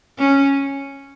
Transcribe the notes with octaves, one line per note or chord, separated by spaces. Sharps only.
C#4